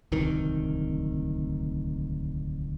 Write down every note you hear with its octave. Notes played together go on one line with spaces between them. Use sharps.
D1 C2 D#3